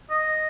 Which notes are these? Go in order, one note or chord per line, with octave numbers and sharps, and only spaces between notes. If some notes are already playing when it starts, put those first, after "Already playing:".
D#5